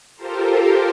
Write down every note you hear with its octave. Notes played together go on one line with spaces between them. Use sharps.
F4 G4 A4 A#4 C5